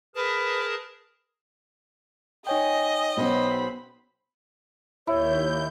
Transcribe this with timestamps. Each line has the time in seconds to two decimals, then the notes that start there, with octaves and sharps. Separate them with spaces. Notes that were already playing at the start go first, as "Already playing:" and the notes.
0.15 G#4 A#4 B4 A5
2.47 D#4 C#5 D#5 G5 G#5
3.17 B1 B3 C#4 C5 B5
5.07 D#2 E4 C#5 G6